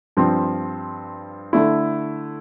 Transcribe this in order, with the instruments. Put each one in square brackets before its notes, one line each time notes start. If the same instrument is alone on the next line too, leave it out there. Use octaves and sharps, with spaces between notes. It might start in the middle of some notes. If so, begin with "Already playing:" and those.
[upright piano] G2 F3 C4
D3 A3 E4